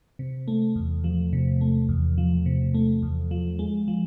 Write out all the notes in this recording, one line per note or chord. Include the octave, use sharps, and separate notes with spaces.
C3
A3
E2
F3
C3
A3
E2
F3
C3
A3
E2
F3
G#3
F3